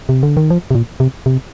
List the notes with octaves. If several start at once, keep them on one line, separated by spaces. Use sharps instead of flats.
C3
D3
D#3
F3
C3
A#2
C3
C3